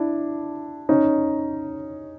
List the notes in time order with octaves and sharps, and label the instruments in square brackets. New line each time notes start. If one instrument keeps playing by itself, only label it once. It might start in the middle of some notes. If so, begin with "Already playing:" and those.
Already playing: [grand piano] D4 E4
C#4 D#4